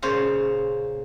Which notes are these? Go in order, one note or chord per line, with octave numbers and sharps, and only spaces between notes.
A#2 C#3 C5 C#5 F5